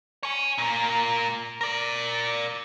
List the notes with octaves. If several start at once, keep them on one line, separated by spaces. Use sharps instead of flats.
C#5 G#5
A#2 A#3
A#4 D5